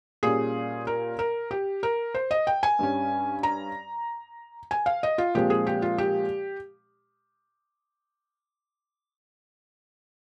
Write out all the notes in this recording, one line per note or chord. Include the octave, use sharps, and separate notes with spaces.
A#2 G3 C#4 G#4
A#4
A#4
G4
A#4
C5
D#5
G5
G#5
G2 G3 C#4
A#5
G#5
F5
D#5
F4
A#2 F3 G#3 C4 G4
G#4
G4
F4
G4